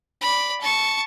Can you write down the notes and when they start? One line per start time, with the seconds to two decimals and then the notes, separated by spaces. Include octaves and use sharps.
0.21 D5 B5
0.61 A5 C#6